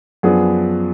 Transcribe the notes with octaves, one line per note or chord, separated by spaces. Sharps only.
F#2 F3 B3 D4 G#4